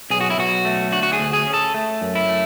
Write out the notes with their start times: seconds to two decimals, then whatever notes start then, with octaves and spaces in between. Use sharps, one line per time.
0.10 B1 G#4
0.21 F#4
0.30 E4
0.38 B1 F#4
0.65 A3
0.92 D3 F#4
1.03 F#4
1.13 G#4
1.20 D2
1.33 G#4
1.47 C#4
1.54 A4
1.74 A3
2.01 F#2
2.16 E4
2.29 A3